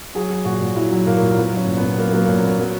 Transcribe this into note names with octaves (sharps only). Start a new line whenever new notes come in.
F#3 G#4
F#3
A#2 F#4
A#2
F#3 E4
F#3
A#2 A#3
A#2
F#3 B3
F#3 C#4
A#2
B3
A#2
F#3 A#3
F#3 A#3
A#2 C#4
A#2 B3
F#3 B3